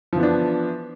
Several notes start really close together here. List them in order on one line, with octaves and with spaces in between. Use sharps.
F3 E3 B3 D4